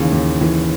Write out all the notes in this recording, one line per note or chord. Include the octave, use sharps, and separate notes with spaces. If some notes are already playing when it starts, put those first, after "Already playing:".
Already playing: D#2 C#3 E3
D#2
E3